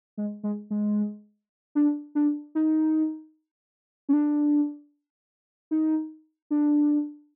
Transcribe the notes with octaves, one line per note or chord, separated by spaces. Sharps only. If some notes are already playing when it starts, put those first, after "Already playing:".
G#3
G#3
G#3
D4
D4
D#4
C#4
D4
D#4
D4